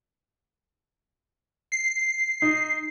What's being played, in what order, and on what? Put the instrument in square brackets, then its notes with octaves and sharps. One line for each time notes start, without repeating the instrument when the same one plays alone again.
[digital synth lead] C7
[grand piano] D#4